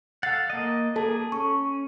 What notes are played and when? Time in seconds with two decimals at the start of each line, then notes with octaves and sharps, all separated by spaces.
0.23 A4 F5 F#5 A6
0.50 A#3 D#5
0.96 A#3 G#4 A4 A5
1.32 C#4 C#6